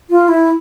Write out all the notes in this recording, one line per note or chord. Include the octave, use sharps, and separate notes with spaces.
F4
E4